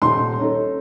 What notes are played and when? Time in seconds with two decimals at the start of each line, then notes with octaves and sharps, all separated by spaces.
0.02 D#1 D#4 C6
0.39 C#4 D#4 A4